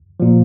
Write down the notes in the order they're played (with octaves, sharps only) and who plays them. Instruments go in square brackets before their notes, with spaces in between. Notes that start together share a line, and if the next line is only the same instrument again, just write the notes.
[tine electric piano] A#2 F3